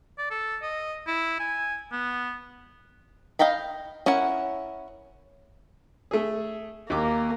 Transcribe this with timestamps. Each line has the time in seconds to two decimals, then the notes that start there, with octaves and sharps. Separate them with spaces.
0.18 D5
0.31 A4
0.62 D#5
1.07 E4
1.39 G#5
1.92 B3
3.39 D#5 F5 G5 A#5 B5
4.06 C#4 E4 A#4 F#5
6.11 A3 G#4
6.90 D#2 A#3 D6